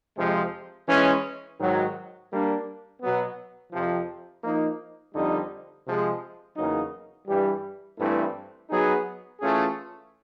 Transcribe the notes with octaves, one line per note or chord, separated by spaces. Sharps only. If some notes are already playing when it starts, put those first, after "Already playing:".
F2 C3 F3 G#3
E3 G#3 C#4
G#2 D#3 F#3
G3 A#3 D4
B2 F#3 B3
F2 C3 F3
F3 A#3 D#4
F2 D3 G3 C4 D#4
C3 F3 G#3
E2 C#3 F#3 A#3 D#4
G2 E3 G3
G2 E3 A3 C4 E4
F#3 B3 D#4 G#4
E3 A3 C#4 F4 G#4